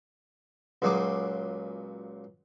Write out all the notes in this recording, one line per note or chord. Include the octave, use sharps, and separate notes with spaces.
C#2 A#2 F#3 G#4 C#6 D6